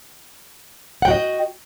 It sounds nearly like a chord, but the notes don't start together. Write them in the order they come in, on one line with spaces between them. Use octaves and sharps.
F#5 G5 F#4 D#5